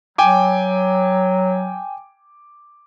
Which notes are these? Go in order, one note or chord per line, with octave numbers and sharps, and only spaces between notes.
F#3 G5 G#5 D6